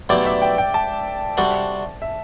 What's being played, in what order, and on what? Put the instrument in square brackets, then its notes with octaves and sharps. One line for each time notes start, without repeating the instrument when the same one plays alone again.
[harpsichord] B1 B2 A3 E4 G4 [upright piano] D5
[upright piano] E5
G5
G5
A5
[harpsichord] C3 G3 D4 F#4 A4
[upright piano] E5